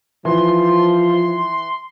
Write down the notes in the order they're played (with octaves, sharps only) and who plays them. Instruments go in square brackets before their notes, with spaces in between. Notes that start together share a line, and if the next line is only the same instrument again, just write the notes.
[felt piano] E3 [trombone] F3 [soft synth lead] C6